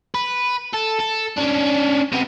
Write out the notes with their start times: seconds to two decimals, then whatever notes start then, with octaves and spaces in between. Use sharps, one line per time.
0.14 B4
0.74 A4
1.00 A4
1.38 C#4 D4
2.12 C3 B3